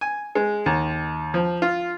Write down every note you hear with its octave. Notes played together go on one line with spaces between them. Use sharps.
G#5
G#3
D#2
F3
F4